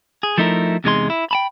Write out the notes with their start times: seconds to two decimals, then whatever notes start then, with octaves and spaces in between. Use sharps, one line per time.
0.23 G#4
0.38 F3 A3 D#4 E4 A#4
0.84 E2 C3 G#3 D#4 G#4 C6
1.10 E4
1.31 G5 A5 B5